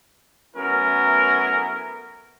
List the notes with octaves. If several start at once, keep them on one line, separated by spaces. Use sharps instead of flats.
F#3 A3 B3 C#4 E4 A#4